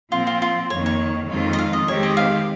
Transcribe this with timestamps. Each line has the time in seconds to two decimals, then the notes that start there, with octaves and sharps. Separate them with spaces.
0.12 A#2 F3 C4 F4
0.27 F4
0.42 F4
0.70 F2 D#3 A#3 C#5
0.86 C#5
1.30 F2 D#3 G#3 C4 F4
1.53 D#5
1.59 F5
1.73 D#5
1.88 D#3 G#3 C4 G4 C#5
2.03 D#5
2.17 F5